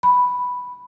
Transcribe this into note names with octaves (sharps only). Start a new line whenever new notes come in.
B5